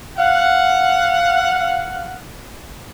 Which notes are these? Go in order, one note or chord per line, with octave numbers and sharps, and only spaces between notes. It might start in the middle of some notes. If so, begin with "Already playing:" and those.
F5 F#5